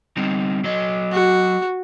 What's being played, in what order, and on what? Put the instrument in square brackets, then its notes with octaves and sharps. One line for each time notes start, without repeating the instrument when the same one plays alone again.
[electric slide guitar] G3 C4 D#4
F#3 D#5
[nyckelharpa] F#4